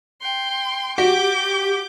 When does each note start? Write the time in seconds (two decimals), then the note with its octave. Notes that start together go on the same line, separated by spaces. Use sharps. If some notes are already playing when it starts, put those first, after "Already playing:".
0.21 G5 C6
0.98 F#4 G4 D6 G6